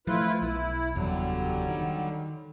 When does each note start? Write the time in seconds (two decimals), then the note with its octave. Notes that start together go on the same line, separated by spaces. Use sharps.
0.07 F3 G3 A3 E4 F4 B4
0.42 B1 E4
0.95 F#1 E2 D3 F#3 G3
1.69 D#3